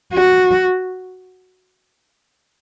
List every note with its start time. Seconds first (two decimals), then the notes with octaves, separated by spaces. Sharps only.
0.14 F#4